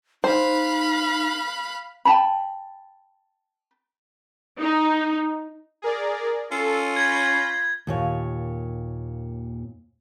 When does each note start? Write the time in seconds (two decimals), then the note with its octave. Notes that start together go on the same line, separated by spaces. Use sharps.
0.24 D#4 C5 F5 B5 F#6
2.05 G5 A5 B5
4.60 D#4
5.82 G#4 A#4 D5
6.52 C#4 F4 A4
6.96 B5 G6 G#6 A#6
7.87 D#2 A#2 C#5